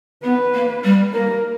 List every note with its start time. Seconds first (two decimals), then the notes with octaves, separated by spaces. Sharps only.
0.24 B3 B4
0.54 A#3
0.84 G3
1.14 A#3 A#4